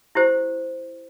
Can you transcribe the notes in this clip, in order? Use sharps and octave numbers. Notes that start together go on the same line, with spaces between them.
E4 G4 C5